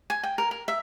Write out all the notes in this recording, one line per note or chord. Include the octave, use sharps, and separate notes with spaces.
G#5
G5
A#4
A#4
E5